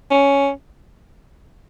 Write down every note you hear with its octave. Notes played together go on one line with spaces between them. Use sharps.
C#4